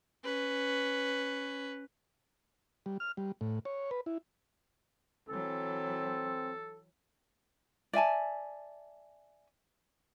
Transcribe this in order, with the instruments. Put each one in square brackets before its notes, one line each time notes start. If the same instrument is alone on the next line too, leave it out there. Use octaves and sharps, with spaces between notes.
[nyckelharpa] C#4 B4
[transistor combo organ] G3
F6
G3
A2
C#5
B4
E4
[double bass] E3 F#3 [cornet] C4 [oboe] A4
[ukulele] D5 E5 G#5 A5